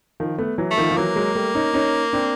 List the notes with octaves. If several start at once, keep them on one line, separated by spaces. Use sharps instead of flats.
D#3 F3
A3 B3
E3 F#3
A3
D#3 F3
F3
E3 F#3 A#3
F#3 G#3
G3 A3
C#4 D#4
C#4 D#4
C4 D4